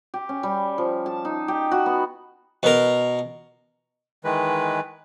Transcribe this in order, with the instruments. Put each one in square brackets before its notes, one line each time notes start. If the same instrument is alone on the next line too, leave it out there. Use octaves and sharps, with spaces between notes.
[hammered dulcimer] G4
C#4
G3
F3
A5
D#4
G4
F#4
B3
[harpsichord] B2 A#4
[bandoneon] D#3 E3 G#3 B4